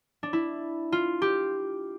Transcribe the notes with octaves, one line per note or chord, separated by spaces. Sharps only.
D4
E4
F4
G4